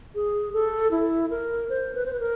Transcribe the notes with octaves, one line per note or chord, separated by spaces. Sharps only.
G#4
A4
E4
A#4
C5
B4
C5
B4
A#4